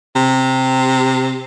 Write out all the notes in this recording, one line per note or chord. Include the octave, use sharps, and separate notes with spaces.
C3